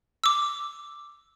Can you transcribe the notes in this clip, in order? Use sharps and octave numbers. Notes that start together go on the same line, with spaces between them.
D6 E6